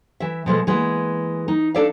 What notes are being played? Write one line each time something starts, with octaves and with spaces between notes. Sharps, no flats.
E3 E5
B2 F3 G#3 A3
E3 G#3 A#3 B3
D#4
D4 D#4 A4 D5 E5 F5